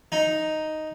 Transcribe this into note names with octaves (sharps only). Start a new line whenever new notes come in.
D#4